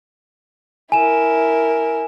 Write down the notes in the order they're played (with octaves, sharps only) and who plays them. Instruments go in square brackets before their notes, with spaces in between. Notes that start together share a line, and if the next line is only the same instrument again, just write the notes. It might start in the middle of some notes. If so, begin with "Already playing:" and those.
[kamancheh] E4 A#4 [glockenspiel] G#5 E7